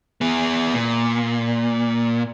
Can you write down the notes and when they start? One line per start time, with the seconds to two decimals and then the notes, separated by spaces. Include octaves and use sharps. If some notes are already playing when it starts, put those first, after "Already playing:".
0.21 B3 G#4
0.74 A#2